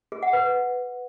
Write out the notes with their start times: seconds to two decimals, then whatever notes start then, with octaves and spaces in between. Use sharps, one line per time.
0.12 G#4
0.23 F#5
0.33 B4